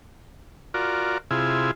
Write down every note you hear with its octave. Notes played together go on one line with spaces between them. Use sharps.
F4 F#4 A#4 D5
C3 E4 F4 G#4